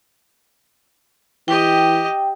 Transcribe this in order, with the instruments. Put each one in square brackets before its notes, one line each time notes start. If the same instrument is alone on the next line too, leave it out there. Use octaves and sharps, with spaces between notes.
[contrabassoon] E3 [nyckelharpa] G4 D#5 [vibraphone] G5